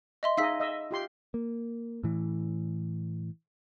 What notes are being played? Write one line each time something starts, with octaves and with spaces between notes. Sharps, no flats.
D#5 E5 C6
D#4 G#4 D#5 F5 E6 B6
D#5 E5
F4 G4 C6
A#3
A2 E3